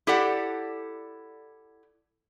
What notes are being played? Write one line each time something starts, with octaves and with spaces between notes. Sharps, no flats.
E4 G4 A4 D5 F#5